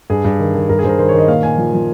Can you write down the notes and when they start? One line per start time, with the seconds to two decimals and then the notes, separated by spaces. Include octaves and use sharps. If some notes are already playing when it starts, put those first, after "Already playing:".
0.10 G2 G#4
0.25 G2
0.39 D#3
0.54 D#3
0.69 G2 A#4
0.79 G#4
0.84 G2 C5
0.89 A#4
0.99 D#3 C5
1.09 C#5
1.13 D#3
1.19 D#5
1.28 A#2 F5
1.43 A#2 G#5
1.58 F3
1.73 F3